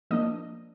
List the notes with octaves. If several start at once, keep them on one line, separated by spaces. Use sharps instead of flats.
F3 A#3 D4 D#5